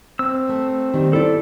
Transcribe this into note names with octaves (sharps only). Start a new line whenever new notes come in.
C4 E6
A3
A#2 D#3 G3
E4 A4 D5